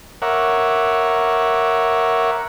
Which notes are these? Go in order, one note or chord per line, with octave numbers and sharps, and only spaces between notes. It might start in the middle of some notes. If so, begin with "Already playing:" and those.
A#4 C#5 E5 F#5 D6